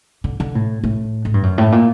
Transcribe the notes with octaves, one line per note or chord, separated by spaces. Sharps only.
D3
D3
A2
A2
A2
G2
F#2
A2
A#2